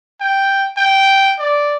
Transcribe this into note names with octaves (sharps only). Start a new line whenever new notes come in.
G5
G5
D5